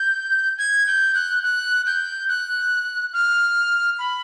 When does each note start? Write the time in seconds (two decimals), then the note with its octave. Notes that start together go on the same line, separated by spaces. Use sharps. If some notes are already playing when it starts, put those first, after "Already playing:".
Already playing: G6
0.58 G#6
0.87 G6
1.15 F#6
1.43 F#6
1.86 G6
2.29 F#6
3.13 F6
3.99 B5